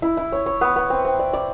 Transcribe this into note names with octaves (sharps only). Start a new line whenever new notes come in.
E4
E4
C#5
C#5
B3
B3
C4
C4
D5
D5